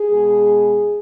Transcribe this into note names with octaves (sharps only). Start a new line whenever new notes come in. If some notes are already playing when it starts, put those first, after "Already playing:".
Already playing: G#4
B2 G#3